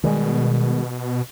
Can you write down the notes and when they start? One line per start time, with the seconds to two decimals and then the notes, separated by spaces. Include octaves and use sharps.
0.03 B2 D#3 G3 G#3